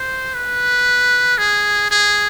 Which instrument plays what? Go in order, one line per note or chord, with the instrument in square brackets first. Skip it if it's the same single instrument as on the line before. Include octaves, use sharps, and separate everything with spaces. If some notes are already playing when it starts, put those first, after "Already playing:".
Already playing: [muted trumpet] C5
B4
G#4
G#4